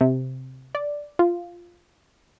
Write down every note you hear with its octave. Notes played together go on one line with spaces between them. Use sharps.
C3
D5
F4